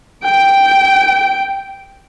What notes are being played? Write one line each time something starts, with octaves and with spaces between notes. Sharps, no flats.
G5 D7